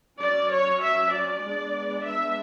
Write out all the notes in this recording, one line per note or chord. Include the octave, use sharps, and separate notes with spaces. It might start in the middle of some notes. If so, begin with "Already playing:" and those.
F#3 C#4 D5
C#5
E5
D5
G#3 B3 D4
E5